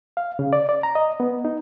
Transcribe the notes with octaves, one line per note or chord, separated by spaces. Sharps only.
F5
C#3
D5
D5
A#5
D#5
B3
D#4